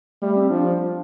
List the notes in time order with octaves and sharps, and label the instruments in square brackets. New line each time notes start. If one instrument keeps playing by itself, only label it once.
[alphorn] G3 [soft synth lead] A3
[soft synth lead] C4
[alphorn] F3 [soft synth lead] D4